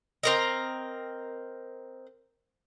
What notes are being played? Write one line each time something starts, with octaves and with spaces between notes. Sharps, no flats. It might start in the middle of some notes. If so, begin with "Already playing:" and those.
C4 A#4 D#5